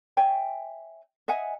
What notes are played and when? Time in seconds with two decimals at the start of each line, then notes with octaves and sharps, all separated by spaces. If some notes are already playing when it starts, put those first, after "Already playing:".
0.17 C#5 E5 G5 G#5
1.28 D#5 E5 F#5 G#5